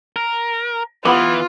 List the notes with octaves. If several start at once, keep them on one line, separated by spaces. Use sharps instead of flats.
A#4
E3 B3 F4 F#5 B5 D6